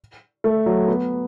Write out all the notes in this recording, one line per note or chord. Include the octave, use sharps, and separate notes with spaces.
A3
F#3
B3